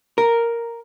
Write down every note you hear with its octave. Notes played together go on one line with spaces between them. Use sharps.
A#4